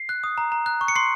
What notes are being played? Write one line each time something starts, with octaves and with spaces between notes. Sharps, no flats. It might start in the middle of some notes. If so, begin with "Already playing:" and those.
Already playing: C7
F#6
D#6
A#5
A#5
F#6
C#6
C#7
C6 C7